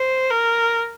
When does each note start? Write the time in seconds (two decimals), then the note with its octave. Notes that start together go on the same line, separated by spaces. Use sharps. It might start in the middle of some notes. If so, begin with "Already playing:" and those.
Already playing: C5
0.30 A#4